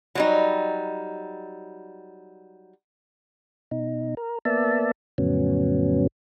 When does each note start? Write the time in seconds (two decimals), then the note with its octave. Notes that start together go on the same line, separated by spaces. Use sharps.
0.15 F#3 G3 D#4
3.71 B2 D#4
4.17 A#4
4.45 A#3 B3 D5 E5 A5
5.18 F2 A2 C#3 F#3 B3 C#4